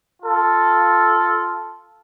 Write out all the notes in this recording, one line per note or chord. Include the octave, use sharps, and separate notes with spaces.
F4 A4